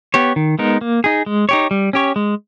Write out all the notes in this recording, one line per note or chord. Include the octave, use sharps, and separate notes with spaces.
B3 G4 C#5
D#3
G#3 B3 D#4 A#4
A#3
D#4 G#4
G#3
D#4 G4 C#5
G3
C#4 G4 C#5
G#3